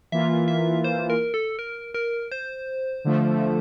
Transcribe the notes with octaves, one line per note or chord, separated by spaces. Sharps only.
E3 A#3 F4 E5
E5
C5
A#4
A4
A#4
A#4
C5
D3 F3 A3